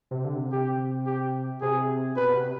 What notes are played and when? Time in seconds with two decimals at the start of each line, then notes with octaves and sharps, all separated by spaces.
0.11 C3
0.25 D3
0.37 C3
0.52 G4
1.06 G4
1.61 C3 G#4
2.16 B2 B4
2.35 C3